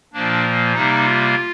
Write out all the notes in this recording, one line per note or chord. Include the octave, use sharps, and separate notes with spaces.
A#2 F3 A#3 D4
C3 G3 A#3 D#4
F4